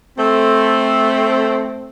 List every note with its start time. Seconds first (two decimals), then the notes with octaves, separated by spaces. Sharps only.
0.18 A3 C4